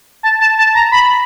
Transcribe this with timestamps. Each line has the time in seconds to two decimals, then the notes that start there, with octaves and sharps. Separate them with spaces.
0.23 A5
0.40 A5
0.58 A5
0.75 A#5
0.92 B5